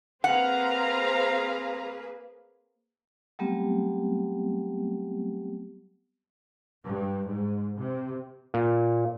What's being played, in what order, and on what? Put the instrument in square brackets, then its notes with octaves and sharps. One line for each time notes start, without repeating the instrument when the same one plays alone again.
[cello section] A#3 G#4 B4 [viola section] C4 F5 A#5 [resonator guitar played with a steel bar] F#5
[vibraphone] F#3 G3 A3 B3 C4 G4
[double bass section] G2
G#2
C3
[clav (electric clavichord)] A#2